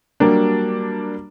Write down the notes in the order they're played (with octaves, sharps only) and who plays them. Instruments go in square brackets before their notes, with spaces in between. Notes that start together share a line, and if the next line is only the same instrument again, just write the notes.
[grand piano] F#3 G3 A#3 D4